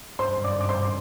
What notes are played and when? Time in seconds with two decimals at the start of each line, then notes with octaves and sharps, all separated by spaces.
0.19 G2 C5 C6
0.38 G2
0.44 D5 D6
0.56 G2 D6
0.69 C5 C6
0.75 G2